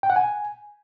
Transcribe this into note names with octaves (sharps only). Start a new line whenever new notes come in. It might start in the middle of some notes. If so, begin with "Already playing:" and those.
G5
F#5
G#5